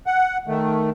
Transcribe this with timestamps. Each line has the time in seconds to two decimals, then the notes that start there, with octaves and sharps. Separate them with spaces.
0.06 F#5
0.48 D#3 A3